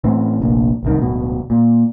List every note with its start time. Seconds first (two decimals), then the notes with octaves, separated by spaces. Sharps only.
0.04 A2 E3 C4
0.40 F1 A#1
0.83 D1 C2 D#3
1.02 D1 B2
1.50 A#2